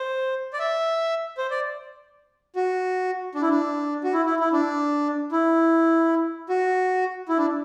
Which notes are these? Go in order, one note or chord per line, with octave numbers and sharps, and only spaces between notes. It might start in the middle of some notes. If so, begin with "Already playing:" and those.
Already playing: C5
D5
E5
C5
D5
F#4
D4
E4
D4
F#4
E4
E4
E4
D4
E4
F#4
E4
D4